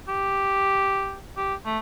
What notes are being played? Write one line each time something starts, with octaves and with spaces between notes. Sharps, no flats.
G4
G4
A3